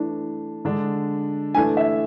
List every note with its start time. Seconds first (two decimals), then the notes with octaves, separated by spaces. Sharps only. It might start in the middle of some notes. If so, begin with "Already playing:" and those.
Already playing: E3 A3 D4
0.65 D3 G#3 D4
1.54 E3 A3 D4 G#5
1.77 E5